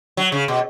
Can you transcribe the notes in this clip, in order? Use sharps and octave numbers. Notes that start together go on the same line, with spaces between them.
F#3
C#3
B2